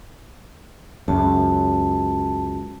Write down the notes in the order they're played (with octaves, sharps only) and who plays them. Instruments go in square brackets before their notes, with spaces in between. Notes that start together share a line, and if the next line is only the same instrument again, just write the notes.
[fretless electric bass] C#2 F#2 [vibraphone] A5